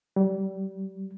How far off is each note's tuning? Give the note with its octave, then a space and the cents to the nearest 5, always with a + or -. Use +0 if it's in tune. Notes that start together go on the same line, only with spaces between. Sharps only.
G3 -25